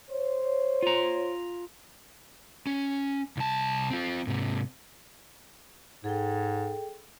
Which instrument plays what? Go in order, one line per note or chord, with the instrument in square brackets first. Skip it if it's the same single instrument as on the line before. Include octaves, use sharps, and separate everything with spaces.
[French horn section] C5 C#5
[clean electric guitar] F4 A#5
[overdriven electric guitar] C#4
C2 A5
C4 F4
G#2 C3
[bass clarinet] G#2 [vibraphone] G#4 A4 G5